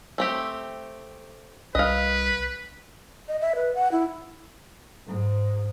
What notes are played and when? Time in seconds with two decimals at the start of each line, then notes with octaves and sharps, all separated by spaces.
0.18 A3 C4 G4
1.75 C2 B4 D#5 F5
3.28 D#5
3.41 E5
3.55 B4
3.75 F#5
3.92 E4
5.07 G#2